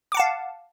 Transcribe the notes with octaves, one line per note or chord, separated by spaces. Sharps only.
F5 F#5 A5 D6